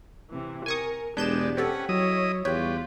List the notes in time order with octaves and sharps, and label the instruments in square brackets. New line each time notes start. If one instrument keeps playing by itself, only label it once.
[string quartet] C3 E3
[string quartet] A#4 [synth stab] G#5 C#6 D#6
[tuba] E1 [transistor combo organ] G#3 B3 [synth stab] D4 G6 E7 [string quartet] G4 D5
[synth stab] C4 G4 A4 [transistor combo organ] C#4 B4 [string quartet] F#5
[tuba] F#3 [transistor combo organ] E4 D#5 D#6 [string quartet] C#5
[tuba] E2 [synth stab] G3 C#5 [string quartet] F4 [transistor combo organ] G4 B4